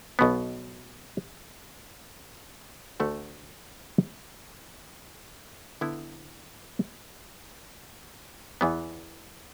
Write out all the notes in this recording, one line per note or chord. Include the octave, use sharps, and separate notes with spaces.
B1 B2 B3
D2 D3 A3 F#4
D3 B3 E4
E2 E3 B3